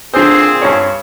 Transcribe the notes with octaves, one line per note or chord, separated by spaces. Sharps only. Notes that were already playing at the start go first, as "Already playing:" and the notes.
A#2 D3 C4 G#4 C5
G2 C#5